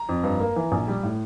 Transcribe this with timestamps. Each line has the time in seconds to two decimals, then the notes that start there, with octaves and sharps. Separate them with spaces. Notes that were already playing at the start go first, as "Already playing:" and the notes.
Already playing: A#5
0.09 F2
0.24 G2
0.40 A#3
0.56 E3
0.72 A#1
0.88 G3
1.03 A2